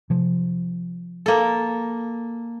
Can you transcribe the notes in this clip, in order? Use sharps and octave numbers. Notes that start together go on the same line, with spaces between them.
C3 F3
A#3 A4